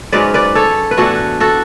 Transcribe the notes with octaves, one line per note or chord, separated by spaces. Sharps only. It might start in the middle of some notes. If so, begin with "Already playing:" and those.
G#2 F#3 C#4 B4 D5
B4 D5
A4 C#5
B4
A2 E3 B3 D4 F#4 A4
F#4 A4